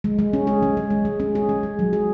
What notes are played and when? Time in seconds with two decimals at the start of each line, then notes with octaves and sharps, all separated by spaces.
0.04 G#3
0.19 G#3
0.33 C#4
0.47 G#4
0.63 G#3
0.77 G#3
0.90 G#3
1.05 G#3
1.20 C#4
1.35 G#4
1.49 G#3
1.63 G#3
1.79 F#3
1.93 G#4